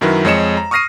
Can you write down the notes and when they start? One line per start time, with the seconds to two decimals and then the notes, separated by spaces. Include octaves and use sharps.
0.01 F#2 D#3 F#3 E4 A#4 B4
0.25 F2 G#3 C#5 D#5 C#7 E7
0.57 A#5
0.71 C#6 D#6 F6 A#6 C7 D#7